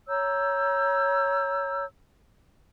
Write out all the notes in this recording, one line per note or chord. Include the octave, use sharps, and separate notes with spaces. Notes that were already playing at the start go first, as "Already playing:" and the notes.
C#5 A#5 E6 G6